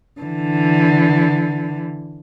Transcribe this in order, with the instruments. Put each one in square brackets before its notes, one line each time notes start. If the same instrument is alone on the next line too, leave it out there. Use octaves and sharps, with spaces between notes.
[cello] D3 E3